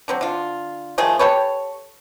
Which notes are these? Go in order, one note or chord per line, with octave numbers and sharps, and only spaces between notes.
D3 F#3 C4
D3 F4
D#3 F3 A3 G#4
G4 A4 B4 C#5